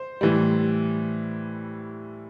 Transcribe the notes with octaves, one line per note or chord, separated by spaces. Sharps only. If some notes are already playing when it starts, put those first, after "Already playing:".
Already playing: C5
A2 E3 G3